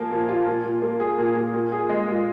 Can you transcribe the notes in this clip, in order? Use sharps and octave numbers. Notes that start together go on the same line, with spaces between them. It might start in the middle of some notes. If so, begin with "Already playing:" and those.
Already playing: A#2 F3 A#3
A#2
F4
A#2
A#2
A#3
G#4
A#2
A#2
A#2
G#4
G#3
F4